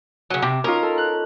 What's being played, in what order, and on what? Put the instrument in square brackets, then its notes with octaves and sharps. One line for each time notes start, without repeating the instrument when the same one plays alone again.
[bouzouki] C#3 F#3
[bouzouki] C3 [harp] D6
[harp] C#4 D#4 F4 [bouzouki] A#4
[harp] A4
F#6